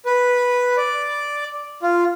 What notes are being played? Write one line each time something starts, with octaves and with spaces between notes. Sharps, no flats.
B4
D5
F4